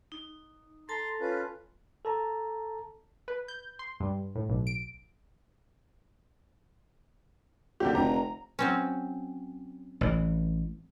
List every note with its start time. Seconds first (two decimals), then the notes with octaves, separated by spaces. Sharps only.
0.12 D#4
0.89 A4 A5 A#5 C6
1.20 C#4 F4 B4
2.05 A4 A5 A#5
3.28 B4
3.48 G6
3.79 C6
4.00 G2
4.35 A2
4.49 B1
4.67 D7
7.80 A#1 D3 F#3 G4
7.95 F1 A#5
8.59 F#3 C4 C#4
10.01 A1 E3